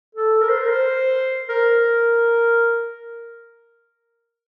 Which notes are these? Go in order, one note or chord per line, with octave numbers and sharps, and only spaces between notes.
A4
A#4
C5
A#4
C5
A#4